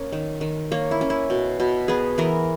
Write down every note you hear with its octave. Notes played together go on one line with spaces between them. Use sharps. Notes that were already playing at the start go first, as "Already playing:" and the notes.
Already playing: A#3 C#4
D#3
D#3
A#3 C#5
E4
C#4
E4
B2
B2
B3 G#4
E3 A#4